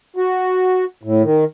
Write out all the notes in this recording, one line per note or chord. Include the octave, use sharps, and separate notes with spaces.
F#4
A2
D#3